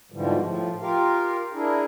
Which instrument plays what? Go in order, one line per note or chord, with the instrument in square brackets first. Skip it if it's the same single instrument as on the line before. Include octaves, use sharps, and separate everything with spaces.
[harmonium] G#2 B2 D3 E3 F3 G3
A2 F3
F4 G4 A#4 F5
D4 E4 G#4 A#4